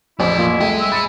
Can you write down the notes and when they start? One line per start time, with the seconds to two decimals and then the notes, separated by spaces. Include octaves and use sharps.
0.20 A1 F2 F3 E4 D5
0.39 A#3 F4
0.61 C2 A3 G#4 D#5 G5
0.80 E5
0.92 B5 E6 A6 C#7